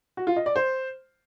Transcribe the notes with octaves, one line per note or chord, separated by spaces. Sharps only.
F#4
F4
D#5
D5
C5